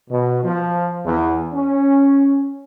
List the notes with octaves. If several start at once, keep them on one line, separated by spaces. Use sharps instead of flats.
B2
F3
E2
C#4